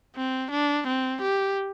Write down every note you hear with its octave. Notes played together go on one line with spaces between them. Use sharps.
C4
D4
C4
G4